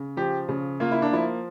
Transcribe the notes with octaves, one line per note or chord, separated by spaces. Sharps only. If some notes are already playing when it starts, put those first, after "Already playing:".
Already playing: C#3
F3 G4
C#3
A#3 F4
E4
D4
F3 E4